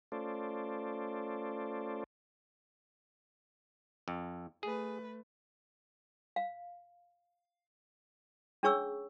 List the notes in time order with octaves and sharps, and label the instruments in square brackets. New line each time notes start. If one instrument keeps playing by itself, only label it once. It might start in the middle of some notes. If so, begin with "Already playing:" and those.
[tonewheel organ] A3 C#4 F4 A4 C5 D5
[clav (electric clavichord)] F2
[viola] A3 B4 [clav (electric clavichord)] G#4
[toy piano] F5
C#4 D4 G#4 C#5 C#6 E6